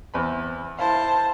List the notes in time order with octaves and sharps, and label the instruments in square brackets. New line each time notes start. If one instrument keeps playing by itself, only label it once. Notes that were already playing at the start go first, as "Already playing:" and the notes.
[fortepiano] E2 C4 B5
[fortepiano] E4 F5 [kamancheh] C5 A5